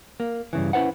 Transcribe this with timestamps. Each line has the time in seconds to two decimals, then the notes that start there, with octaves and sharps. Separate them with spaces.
0.20 A#3
0.53 G2 C#3 E3
0.73 C#4 E4 B4 C5 F#5